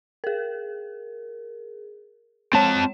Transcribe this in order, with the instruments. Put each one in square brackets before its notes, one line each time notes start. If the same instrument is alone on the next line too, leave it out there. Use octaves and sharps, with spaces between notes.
[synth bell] G#4 A#4
[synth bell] G#3 C#5 E7 [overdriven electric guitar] C4 A5